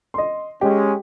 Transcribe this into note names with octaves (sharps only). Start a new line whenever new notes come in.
D#5 C6
G#3 C#4 G4